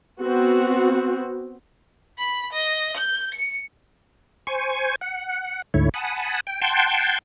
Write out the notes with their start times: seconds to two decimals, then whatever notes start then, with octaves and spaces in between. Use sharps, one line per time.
0.20 B3 C4 F#4
2.18 B5
2.53 D#5
2.97 G6
3.34 C#7
4.47 C5 G#5 C#6
5.01 F#5
5.74 D2 G#2 D3 E4 C#5
5.94 F#5 G#5 A5 B5 D#6
6.47 G5
6.62 F#5 G5 A5 C6 G6 G#6